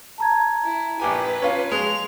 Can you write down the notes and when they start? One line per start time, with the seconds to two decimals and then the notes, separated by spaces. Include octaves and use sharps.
0.18 A5 A#5 G#6
0.64 E4
1.00 A#1 G4 B4 G#5
1.42 C#4 F4
1.72 G#3 F7